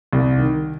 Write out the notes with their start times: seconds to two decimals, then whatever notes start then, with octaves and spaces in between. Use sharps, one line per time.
0.13 C2
0.38 D#3